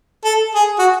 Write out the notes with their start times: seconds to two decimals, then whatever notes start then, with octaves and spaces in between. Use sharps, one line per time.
0.24 A4
0.55 G#4
0.78 F#4